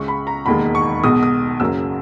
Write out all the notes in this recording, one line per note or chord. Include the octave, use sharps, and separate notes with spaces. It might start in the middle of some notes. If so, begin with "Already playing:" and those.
Already playing: C#2 C#3 G#3 C#6
B5
A#5
E1 D#2 D#3 G#3 B5
C#6
B1 B2 G#3 D#6
D#6
F#1 F#2 C#3 F#3 E6